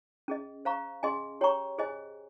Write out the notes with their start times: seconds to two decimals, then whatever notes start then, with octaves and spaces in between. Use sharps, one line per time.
0.28 C#4 G#4 D#5
0.65 C5 F5 A#5 C#6
1.03 C#4 G#4 D#5 G#5 C6
1.41 G4 C#5 G5 A#5 C#6
1.78 G#4 C5 D#5 G#5